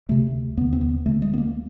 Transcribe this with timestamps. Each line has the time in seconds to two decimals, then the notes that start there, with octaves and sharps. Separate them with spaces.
0.09 D2 C3 A3
0.57 D#2 B3
0.61 D3
0.73 C4
0.81 B3
1.06 D2 A3
1.09 D3
1.22 G#3
1.34 B3
1.38 A#3